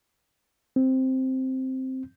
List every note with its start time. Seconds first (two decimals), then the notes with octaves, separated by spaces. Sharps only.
0.76 C4